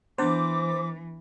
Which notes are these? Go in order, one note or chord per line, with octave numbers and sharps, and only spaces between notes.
E3 B3 D4 C5 D6